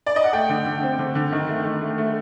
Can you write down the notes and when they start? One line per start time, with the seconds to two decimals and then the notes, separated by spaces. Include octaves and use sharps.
0.06 D5
0.16 D#5
0.24 F#5
0.33 A3 G5
0.49 D3
0.66 D3
0.82 C4
0.99 D3
1.15 D3
1.32 D#3
1.49 A3
1.65 D#3
1.81 A3
1.98 A3